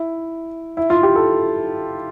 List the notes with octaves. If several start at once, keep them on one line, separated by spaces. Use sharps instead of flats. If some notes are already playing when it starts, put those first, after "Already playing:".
Already playing: E4
E4
F4
G4
A4